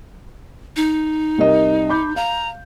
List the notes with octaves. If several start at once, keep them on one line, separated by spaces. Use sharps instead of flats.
D#4
C2 A#4 D#5
B5 D6 G6
F5 A#5